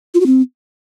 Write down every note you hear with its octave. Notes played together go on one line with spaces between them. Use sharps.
F4
F#4
C4